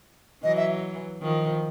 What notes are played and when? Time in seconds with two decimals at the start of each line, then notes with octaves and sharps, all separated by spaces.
0.44 E3 F#3 D#5
0.57 E5
1.22 D#3 F3